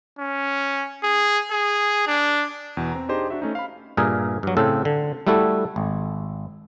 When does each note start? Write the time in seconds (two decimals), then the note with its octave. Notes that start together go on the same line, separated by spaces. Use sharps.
0.19 C#4
1.03 G#4
1.51 G#4
2.07 D4
2.77 E2 B2
2.92 C4 A#5
3.09 D4 D#4 G4 G#4 C5 D#5
3.30 D4 F#4 E5
3.42 A3 C#4 D#4
3.55 F5 B5
3.97 G2 A#2 G#4 A#4 E5
4.43 G2 F#3
4.57 A2 C#3 C4 A4
4.85 D3
5.27 G3 A3 E4 F#4 A4
5.76 G#1